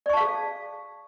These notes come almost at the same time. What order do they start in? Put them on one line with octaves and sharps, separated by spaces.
D5 C#6 A5 F5 G#4